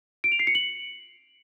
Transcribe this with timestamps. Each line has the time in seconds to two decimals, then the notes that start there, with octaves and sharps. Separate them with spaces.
0.24 D7
0.32 F7
0.39 C7
0.47 C#7
0.55 F#7